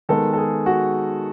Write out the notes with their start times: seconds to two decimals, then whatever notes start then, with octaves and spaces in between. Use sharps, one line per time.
0.09 D#3 G#3 B3 A4
0.33 A4
0.38 G#4
0.66 F#4